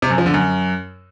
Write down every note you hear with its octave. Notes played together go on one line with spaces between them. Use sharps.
C3
F#2
F3
D3
F#2